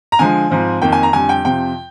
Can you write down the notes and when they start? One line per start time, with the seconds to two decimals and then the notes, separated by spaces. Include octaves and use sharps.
0.12 A#5
0.19 D3 F3 G#3 G#5
0.50 G#2 F3 C4
0.82 F2 D#3 A#3 G5
0.92 G#5
1.03 A#5
1.13 F2 D3 G3 G#5
1.29 G5
1.45 F2 C3 F3 G5